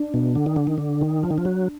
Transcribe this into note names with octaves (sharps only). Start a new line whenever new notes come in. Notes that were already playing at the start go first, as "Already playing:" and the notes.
Already playing: D4
B2
D3
D#3
D3
D#3
D3
D#3
F3
D#3
F3
F#3